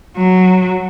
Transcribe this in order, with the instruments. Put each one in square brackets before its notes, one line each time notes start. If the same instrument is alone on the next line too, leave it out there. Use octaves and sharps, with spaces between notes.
[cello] F#3